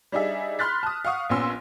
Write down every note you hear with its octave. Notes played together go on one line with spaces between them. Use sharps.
G3 D4 D#4 G#4 E5
B5 C6 F6 F#6 A6 B6
A5 D#6
F5 F#5 C#6 D#6
A#1 A#2 B3 C#4 C6 E6